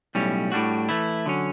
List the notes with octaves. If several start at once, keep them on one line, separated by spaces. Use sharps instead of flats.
B1 A2 G3 C#4
A2 G3 D4 F#4
E3 A3 E4
D3 F#3 C#4